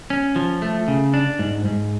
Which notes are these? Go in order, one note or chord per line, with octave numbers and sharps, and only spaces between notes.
C#4
F3
A3
C#3
D4
G#2
G#2